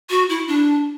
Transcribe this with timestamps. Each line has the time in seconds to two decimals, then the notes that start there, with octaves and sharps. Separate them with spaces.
0.10 F#4
0.29 E4
0.48 D4